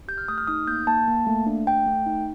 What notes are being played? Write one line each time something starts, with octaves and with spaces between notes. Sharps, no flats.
G4 G6
F6
A3 D#6
F6
D#4 D#6
A#3 G6
A#3 A5
A#3
A3
D4
A3 G5
A3
D#4